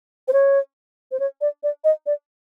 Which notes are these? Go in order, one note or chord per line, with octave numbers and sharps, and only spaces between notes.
C5
C#5
C5
C#5
D5
D5
D#5
D5